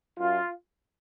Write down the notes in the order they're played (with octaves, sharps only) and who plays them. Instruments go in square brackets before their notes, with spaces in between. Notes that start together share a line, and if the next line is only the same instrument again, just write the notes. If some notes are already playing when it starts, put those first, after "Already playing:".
[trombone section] F#2 F4